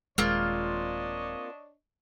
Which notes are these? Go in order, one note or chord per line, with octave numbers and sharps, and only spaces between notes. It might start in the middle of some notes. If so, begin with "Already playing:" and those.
D#1 G#3 A#3 C4 D4 F4 C#5 D#5